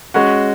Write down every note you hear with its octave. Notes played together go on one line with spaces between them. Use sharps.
G#3 C#4 F#4